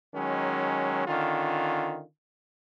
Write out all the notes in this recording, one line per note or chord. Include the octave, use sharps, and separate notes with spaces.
D#3 F#3 G#3 C#4
D3 D#3 C#4 F4